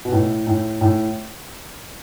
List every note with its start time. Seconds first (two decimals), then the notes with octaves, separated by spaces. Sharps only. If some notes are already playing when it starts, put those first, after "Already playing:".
0.05 B2
0.12 A2
0.47 A2
0.81 A2